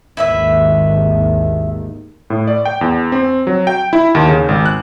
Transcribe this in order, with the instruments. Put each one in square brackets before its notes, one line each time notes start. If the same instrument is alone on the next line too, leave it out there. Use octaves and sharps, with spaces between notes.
[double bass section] G#1 D#2 [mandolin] E4 B4 E5
[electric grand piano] A2
D5
G5
E2
C4
F#3
G5
E4
D#2
C#3
G#1
F#6